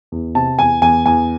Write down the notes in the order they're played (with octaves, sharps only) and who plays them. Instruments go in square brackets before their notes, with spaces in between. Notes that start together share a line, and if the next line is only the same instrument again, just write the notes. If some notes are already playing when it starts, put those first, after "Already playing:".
[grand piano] E2
C3 A5
E2 G#5
E2 G#5
E2 G#5